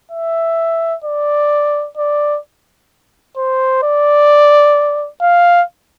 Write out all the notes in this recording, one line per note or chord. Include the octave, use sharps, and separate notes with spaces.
E5
D5
D5
C5
D5
F5